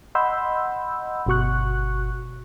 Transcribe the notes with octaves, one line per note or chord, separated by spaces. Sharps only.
D#5 F#5 B5 C6 E6 G6
G1 B2 F#4 C#6 F#6